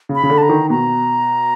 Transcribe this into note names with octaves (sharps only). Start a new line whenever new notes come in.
C#3
B5
C#3
D3
A5
A#5
D#3
B2 A#5